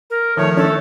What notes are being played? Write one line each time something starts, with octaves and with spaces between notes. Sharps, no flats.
A#4
D#3 F3 A3 C#5
C#4 A4